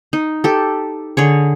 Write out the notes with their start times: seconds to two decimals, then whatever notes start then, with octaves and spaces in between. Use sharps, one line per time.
0.13 D#4
0.44 G4 A4
1.17 D3 G#4 C#5